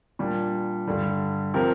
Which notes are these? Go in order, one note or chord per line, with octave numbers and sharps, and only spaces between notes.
A#2 G3 D4
G2 D3 G3
C3 F3 C4 G4 A#4